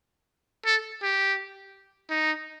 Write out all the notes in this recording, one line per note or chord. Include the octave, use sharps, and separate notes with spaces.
A4
G4
D#4